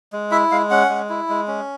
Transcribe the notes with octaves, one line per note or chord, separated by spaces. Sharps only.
G#3
E4 E5
G#3 F5
C#4 F#5
G#3
E4
G#3
C#4